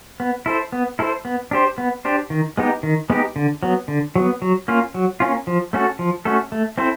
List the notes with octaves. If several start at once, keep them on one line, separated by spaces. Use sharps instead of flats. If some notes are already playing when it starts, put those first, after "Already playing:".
B3
E4 A4 C5
B3
E4 A4 C5
B3
D4 G4 C5
B3
D4 G4 C5
D#3
G#3 B3 D#4 G4
D#3
G#3 B3 D#4 G4
D3
F#3 B3
D3
F#3 B3
F#3
A#3 C#4 F4
F#3
A#3 C#4 F4
F3
A3 C#4 F#4 A4
F3
A3 C#4 F#4 A4
A3
C4 E4 A4 C5